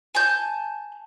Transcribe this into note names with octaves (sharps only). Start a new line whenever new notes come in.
G#5 A5 G6